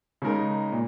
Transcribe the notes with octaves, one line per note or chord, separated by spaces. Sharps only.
C#3 G#3 D#4 A#4
A#2